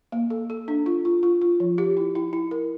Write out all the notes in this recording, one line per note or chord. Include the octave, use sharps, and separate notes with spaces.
A#3
A4
A4
D4
F4
F4
F4
F4
F3
G4
E4
E4
E4
A#4